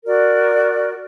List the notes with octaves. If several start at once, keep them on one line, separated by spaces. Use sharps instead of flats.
F#4 A#4 D5